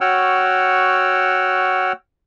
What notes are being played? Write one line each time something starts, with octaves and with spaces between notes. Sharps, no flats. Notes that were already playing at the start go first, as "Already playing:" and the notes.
F#4 C#5 F#5 G5 E6 F6